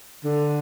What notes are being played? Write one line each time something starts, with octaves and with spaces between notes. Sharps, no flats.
D3